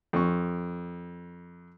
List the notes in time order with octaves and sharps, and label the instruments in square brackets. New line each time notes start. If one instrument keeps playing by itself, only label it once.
[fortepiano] F2 C#6